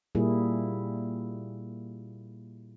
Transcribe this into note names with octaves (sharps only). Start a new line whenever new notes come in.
A#2 G3 A#3 E4 G#4